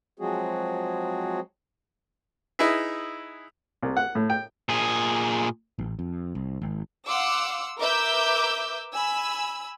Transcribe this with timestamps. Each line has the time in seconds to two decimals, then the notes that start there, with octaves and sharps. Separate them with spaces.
0.19 F3 F#3 G#3 C4 F#4 G#4
2.59 D#4 E4 G#4 B4 E5
3.83 C2
3.97 F#5
4.15 A2
4.30 G5
4.69 A#2 G#4
5.79 A1
5.99 F2
6.35 C2
6.62 G#1
7.06 F5 F#5 C6 D6 E6
7.78 A#4 B4 E5 D6 E6 G6
8.93 G#5 B5 E6